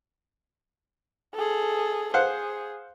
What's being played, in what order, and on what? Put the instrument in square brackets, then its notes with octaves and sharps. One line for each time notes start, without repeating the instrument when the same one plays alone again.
[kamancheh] G#4 A4
[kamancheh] G#4 [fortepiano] C5 F5 F#5